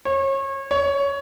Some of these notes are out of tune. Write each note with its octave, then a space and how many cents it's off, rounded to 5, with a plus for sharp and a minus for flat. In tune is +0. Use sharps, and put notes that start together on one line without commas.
C#5 -30
C#5 +15